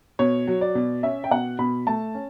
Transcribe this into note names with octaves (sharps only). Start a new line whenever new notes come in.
B2 C#5
F#3
D5
B2
C#4 E5
G5
B2 F#5
B2 B5
A3 A5
C#4